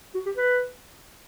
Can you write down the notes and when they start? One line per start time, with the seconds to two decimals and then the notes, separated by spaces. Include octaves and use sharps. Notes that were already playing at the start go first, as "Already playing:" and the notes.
0.15 F#4
0.26 G4
0.37 B4